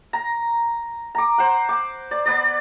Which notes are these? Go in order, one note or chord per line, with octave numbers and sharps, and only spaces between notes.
A#5
A#5 D6
C5 F#5
D6
D5
B3 D5